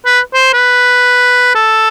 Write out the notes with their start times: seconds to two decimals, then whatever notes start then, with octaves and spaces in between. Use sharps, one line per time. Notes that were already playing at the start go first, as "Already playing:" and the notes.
0.06 B4
0.34 C5
0.53 B4
1.55 A4